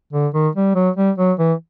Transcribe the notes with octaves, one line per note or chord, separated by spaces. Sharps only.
D3
D#3
G3
F#3
G3
F#3
E3